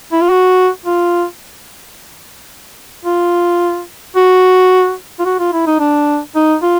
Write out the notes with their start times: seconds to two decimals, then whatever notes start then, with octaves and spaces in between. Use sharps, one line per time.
0.12 E4
0.21 F4
0.30 F#4
0.86 F4
3.05 F4
4.16 F#4
5.19 F4
5.25 F#4
5.39 F4
5.53 E4
5.67 D#4
5.80 D4
6.36 D#4
6.63 F4